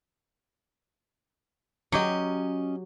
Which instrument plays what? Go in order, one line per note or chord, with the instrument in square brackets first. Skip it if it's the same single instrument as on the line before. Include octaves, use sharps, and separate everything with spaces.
[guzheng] F#3 G4 [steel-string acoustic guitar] C#4 D#5